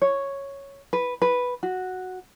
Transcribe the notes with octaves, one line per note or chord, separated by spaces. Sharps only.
C#5
B4
B4
F#4